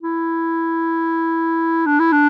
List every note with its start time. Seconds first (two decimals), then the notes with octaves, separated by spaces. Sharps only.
0.03 E4
1.86 D4
1.99 E4
2.12 D4